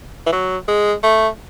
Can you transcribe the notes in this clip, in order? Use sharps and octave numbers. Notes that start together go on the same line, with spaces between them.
E3
F#3
G#3
A3